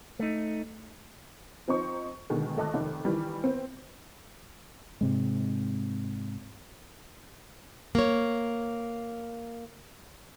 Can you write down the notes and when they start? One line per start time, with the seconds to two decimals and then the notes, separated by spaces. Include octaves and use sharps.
0.19 A3 D#4
1.68 F3 C4 D#4 C5 C#6
2.30 B2 D3 D#3 G#3 A3
2.57 G#1 A3 D#5 A5 D6 F#6
2.74 F1 D#3
3.05 D#3 E3 G3
3.44 B3 C4
5.01 G#2 C3 G#3
7.95 A#3 C#5